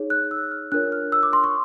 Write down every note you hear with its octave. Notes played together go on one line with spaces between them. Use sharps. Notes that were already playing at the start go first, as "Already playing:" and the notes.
Already playing: D#4 G#4 C#5
F#6
E6
F6
D4 F4 A#4 C#5 F#6
F6
E6
D6
C6
C#6